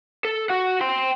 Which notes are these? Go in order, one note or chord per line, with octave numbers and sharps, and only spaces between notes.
A4
F#4 F#5
G5 C6